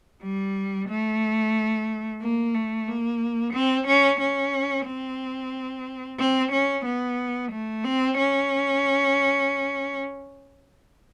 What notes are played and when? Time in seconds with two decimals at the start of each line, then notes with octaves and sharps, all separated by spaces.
0.22 G3
0.89 A3
2.21 A#3
2.54 A3
2.87 A#3
3.53 C4
3.87 C#4
4.20 C#4
4.86 C4
6.19 C4
6.52 C#4
6.85 B3
7.51 A3
7.84 C4
8.18 C#4